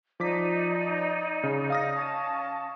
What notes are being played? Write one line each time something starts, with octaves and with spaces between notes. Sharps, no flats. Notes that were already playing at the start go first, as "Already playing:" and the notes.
F3 D#4 D5 D6 B6
C#3
F5 D#6 A#6
C#4 A5